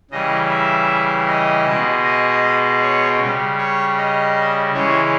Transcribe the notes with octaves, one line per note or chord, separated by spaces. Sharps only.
C#3 E3 G3 D#5
E5
D#5
B2 G#3
D#5
C#5
C#3 G3
C#5
D#5
C#3 E3 G#3 C#5